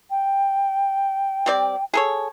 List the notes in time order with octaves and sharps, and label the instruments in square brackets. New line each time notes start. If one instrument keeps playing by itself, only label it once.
[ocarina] G5
[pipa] G3 C4 D5
G#4 A4 C#5